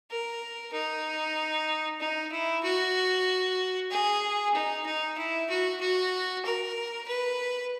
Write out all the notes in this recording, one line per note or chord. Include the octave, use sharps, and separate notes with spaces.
A#4
D#4
D#4
E4
F#4
G#4
D#4
D#4
E4
F#4
F#4
A#4
B4